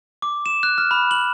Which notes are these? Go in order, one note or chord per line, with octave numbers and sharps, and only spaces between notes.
D6
E7
F#6
F6
B5
F#7